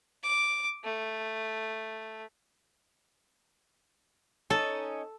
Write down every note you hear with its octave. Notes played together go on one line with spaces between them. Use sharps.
D6
A3
C#4 D#4 A4